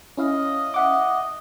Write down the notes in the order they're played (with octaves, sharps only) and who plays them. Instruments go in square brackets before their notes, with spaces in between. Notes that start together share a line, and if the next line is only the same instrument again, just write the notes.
[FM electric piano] C#4 E4 F5 [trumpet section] D#5
[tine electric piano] E5 F#5 D6